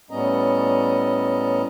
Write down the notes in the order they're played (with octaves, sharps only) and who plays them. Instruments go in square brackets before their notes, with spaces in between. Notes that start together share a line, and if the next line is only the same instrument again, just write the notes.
[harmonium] A2 G3 B3 C#4 D#5 A#5